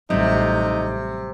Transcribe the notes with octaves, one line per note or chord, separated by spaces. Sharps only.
A1 C3 F#3 G3 D#4